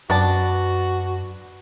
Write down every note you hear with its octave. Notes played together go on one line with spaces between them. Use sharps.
F#2 B3 D4 F#4 A5